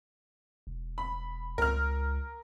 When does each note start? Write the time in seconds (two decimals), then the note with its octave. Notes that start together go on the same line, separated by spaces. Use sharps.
0.67 E1
0.98 B5
1.58 C#2 A#4 F6